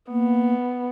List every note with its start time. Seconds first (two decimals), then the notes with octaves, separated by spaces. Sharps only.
0.11 A#3 B3